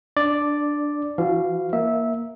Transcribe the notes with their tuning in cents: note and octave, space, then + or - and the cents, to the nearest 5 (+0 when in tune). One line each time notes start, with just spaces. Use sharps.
D4 +0 D5 +0
E3 +40 F#4 +0 F5 -10
A#3 +5 E5 -15